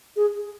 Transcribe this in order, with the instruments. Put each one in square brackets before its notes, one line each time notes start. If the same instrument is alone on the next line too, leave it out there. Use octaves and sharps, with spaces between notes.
[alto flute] G#4